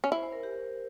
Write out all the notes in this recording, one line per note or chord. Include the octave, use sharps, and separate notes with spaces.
C#4
E4 C5
C5
A#4
G4